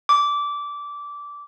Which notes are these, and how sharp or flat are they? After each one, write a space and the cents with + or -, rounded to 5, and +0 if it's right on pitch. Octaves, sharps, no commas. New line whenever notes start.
D6 -15